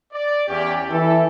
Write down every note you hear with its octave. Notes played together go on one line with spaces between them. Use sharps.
D5
E2 C#4 G4
E3 A4